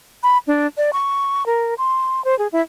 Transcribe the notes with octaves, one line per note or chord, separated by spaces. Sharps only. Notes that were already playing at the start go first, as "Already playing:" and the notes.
B5
D4
D5
C#6
A#4
C6
C5
G#4
E4